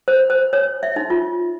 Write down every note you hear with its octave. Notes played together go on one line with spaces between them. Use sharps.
C5
C5
C#5
E5
D#4
F4